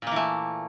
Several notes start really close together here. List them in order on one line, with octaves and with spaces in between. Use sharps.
A#2 A#3 E3 A3